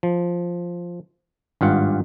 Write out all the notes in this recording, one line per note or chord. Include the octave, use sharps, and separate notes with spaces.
F3
G#1 G2 F4 F#5